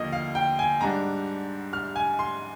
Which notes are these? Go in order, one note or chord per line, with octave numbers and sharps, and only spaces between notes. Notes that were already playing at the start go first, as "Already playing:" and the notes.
Already playing: D#2 D3 F3 A#3 D#5
F5
G5
G#5
G#2 G3 D4 A#5
F6
G#5
C6